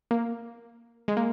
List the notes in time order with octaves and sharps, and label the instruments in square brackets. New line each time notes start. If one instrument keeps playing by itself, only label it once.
[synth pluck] A#3
G#3
A#3